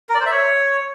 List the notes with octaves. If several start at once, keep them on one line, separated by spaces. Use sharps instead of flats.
A#4
D5
C5
E5
C#5